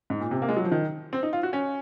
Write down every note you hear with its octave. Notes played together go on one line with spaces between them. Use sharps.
G#2
A#2
C3
A#3
G#3
F#3
F3
D#3
C4
D#4
F4
F#4
C#4